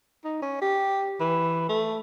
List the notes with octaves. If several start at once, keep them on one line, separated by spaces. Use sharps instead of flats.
D#4
C#4
G4
E3
A3